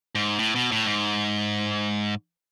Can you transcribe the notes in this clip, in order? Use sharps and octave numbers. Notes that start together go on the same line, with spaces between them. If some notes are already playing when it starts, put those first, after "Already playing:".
G#2
A2
B2
A2
G#2